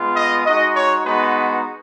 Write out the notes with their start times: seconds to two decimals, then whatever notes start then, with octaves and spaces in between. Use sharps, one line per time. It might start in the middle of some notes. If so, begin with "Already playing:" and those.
Already playing: G#3 B3 F4
0.16 D#5
0.45 G#3 D#4 F#4 D#5
0.76 C#5
1.05 G#3 B3 D#4 F#4 B4